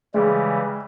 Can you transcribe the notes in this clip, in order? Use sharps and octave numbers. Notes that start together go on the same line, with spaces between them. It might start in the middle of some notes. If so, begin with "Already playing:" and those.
C#3 E3 G3 G#3